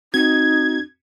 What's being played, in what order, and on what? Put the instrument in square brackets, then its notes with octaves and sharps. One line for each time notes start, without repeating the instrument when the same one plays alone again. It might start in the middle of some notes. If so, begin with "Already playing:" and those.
[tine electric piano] C4 F#4 [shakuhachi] D#4 [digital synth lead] G#6